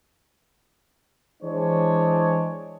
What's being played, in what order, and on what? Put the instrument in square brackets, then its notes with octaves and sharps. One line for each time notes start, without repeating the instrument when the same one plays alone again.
[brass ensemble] E3 G#3 D4 C5 C#5